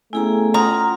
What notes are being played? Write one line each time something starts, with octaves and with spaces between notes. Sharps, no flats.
A3 B3 C#4 E4 G#4 G#5 A#5
C#4 F4 F#5 A#5 C6 D#6